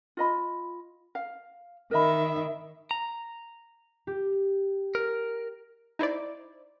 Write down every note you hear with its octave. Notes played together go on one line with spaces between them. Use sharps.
F4 D#5 B5
F5
D#3 A#4 D#5 E5 B5
A#5
G4
A#4
D#4 E4 C5 D5